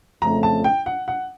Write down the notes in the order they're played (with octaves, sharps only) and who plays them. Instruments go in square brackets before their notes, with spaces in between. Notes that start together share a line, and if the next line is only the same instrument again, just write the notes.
[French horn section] F2 C#3 F3 A3 [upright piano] A#5
[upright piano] A5
G5
F#5
F#5